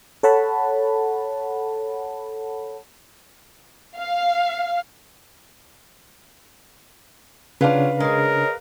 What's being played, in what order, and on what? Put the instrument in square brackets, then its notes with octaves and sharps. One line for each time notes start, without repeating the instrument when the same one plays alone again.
[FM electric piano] A4 C#5 F#5 A5 B5
[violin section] F5
[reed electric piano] C#3 D4 [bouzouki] F#3 F4 [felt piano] B4 F5
[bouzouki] G#3 C#5 [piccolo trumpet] A#4